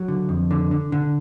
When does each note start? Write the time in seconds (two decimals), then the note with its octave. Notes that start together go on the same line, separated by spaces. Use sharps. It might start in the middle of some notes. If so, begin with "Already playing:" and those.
Already playing: F#3
0.08 D3
0.29 F2
0.51 D3
0.71 D3
0.92 D3